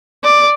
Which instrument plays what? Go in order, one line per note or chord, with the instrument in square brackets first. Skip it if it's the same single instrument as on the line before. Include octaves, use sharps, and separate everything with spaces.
[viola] D5